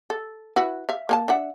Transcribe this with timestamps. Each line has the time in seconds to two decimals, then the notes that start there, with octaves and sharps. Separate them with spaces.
0.10 A4
0.56 E4 F#4 B4
0.89 E5 F5
1.09 A#3 A#4 A5
1.28 D4 E5 F#5